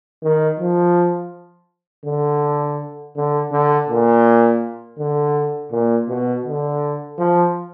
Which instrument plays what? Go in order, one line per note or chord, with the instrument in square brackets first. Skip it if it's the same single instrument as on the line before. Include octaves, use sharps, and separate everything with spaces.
[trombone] D#3
F3
D3
D3
D3
A#2
D3
A#2
B2
D3
F3